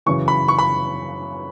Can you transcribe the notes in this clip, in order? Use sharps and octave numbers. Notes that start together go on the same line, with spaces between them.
F#2 C#3 E3 C#6
B5
C#6
B5